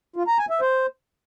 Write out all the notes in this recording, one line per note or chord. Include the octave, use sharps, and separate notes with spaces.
F4
A#5
G#5
E5
C5